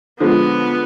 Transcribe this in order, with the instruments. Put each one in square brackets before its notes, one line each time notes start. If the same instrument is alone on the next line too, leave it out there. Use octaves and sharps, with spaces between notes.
[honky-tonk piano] D3 F3 G#3 [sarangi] B3